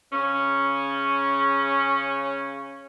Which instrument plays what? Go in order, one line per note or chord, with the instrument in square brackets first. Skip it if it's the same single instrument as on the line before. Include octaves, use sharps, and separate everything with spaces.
[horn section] C#3 C#4